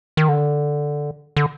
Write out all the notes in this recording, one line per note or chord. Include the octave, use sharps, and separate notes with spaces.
D#3
D3
D3